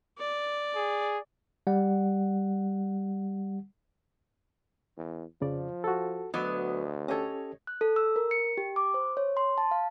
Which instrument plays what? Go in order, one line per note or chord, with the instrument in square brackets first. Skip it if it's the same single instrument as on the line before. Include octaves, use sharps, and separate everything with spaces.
[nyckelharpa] D5
[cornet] G#4
[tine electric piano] G3 F#5
[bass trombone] E2
[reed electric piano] F2 C#3 D5 [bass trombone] F3
[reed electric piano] F#4 A4
[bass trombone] D2 [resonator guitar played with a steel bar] F#3 B3 [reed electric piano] D#5 D6 D#6
[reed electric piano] C#4 G4 A4 [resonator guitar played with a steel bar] C#5 D#5
[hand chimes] F#6
A4
E6
A#4
C#7
G4
D6
C5
C#5
C6
A5
F5